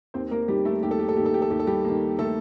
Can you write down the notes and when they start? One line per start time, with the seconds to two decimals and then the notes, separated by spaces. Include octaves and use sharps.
0.14 D#2 C4 C5
0.31 A#3 A#4
0.48 D#3 G3 A#3 G4
0.65 A3 A4
0.83 D#2 G4
0.91 A4
0.99 G4
1.09 A4
1.16 D#3 A#3 G4
1.26 A4
1.34 G4
1.42 A4
1.50 D#2 G4
1.59 A4
1.67 G3 G4
1.85 A#3
1.90 D#3
2.19 A3 A4